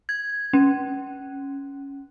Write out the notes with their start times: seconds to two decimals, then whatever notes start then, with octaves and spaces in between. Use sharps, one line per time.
0.09 G#6
0.53 C#4